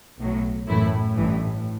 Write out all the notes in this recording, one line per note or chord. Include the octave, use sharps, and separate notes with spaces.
B1 A2 F#3
F#2 A2 E3 A3 E4
A1 G2 E3